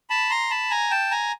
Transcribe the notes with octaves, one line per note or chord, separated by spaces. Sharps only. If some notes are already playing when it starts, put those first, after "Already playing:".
A5 B5
A#5 C6
A5 B5
G#5 A#5
G5 A5
G#5 A#5